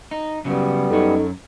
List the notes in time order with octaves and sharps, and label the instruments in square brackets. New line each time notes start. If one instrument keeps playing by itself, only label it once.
[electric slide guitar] D#4
[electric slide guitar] C#3 F#3 [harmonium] G3 B3
[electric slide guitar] F#2 C#4 [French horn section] D#4 A4